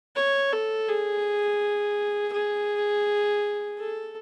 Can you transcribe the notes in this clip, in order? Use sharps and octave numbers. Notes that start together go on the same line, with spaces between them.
C#5
A4
G#4
G#4
A4